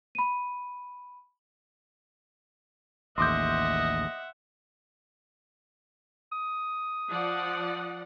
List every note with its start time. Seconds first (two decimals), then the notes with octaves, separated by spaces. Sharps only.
0.15 B5 D#7
3.18 A1 D#2 D#5 E5 F#5 C6 D6 G6
6.32 D#6
7.11 F3 D5 F#5